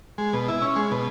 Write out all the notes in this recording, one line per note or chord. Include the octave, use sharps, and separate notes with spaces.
G#3
B2
E4
C#4
G#3
B2